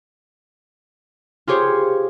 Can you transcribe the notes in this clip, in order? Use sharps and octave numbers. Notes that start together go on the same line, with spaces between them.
F4 G4 G#4 C5 C#5